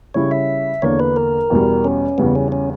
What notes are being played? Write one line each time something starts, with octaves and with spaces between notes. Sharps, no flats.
C#3 G3 C#4 E4 C#5
E5
E2 D3 A#3 D4 C#5
B4
A#4
E2 B2 G3
C#4
E2 C#3 G3 B3
C#4
C#4